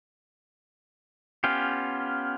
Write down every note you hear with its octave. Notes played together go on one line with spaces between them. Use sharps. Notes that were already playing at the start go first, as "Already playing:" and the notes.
B3 C#4 F4 G4